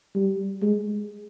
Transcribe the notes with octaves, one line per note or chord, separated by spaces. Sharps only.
G3
G#3